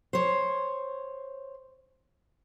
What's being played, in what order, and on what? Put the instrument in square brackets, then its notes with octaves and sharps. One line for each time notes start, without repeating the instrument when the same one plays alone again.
[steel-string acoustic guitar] C5 C#5